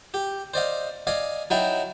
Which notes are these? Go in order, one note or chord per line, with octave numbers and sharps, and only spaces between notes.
G4
C5 D5 D#5 F5
D5 D#5 F5 G#5
F#3 D#4 E4 G5 A5